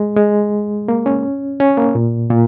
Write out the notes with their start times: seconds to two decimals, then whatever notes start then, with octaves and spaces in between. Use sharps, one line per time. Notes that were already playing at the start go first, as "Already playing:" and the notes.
Already playing: G#3
0.17 G#3
0.88 A#3
1.06 C#4
1.60 C#4
1.77 A#3
1.95 A#2
2.30 A#2